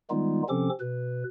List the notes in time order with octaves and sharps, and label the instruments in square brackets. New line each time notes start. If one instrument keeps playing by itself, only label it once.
[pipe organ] D#3 G3 G#3 B3 D#4 F4
C3 F3 C4 C#4 A4 D6
B2 B4